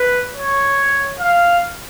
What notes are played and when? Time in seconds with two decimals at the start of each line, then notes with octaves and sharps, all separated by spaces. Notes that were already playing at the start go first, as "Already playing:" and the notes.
Already playing: B4
0.34 C#5
1.20 F5